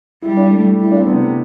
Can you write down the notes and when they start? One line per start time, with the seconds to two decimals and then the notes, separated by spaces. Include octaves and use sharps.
0.22 G3 E4
0.37 D4
0.51 A3
0.80 G3 E4
0.92 D4
0.99 C4
1.07 C3 B3